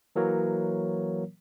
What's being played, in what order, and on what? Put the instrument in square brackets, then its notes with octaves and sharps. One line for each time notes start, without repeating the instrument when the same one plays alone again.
[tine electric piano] E3 F#3 A#3 A#4 C#5